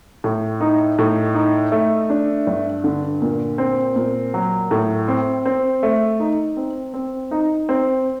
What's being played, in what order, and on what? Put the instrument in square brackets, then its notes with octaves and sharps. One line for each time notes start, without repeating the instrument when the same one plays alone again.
[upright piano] A2
D#4
A2
D#4
A3
D4
G2
D3
A#2
C4
A#2
F#3
A2
C4
C4
A3
D#4
C4
C4
D#4
C4